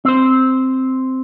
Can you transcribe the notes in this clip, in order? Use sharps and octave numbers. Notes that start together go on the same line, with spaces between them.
C4 C5